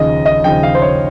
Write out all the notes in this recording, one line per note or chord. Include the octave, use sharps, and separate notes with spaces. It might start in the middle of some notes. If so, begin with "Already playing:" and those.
Already playing: D#2 C#3 F3 D#5
D#5
D#2 C#3 F3 G5
F5
C5
C#5